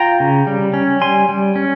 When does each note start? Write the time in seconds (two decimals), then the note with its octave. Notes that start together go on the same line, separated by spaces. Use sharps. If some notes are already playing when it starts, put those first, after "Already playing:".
Already playing: F4 G5 A#5
0.20 C#3
0.47 G3
0.74 C#4
1.01 G3 G#5 C6
1.29 G3
1.56 C#4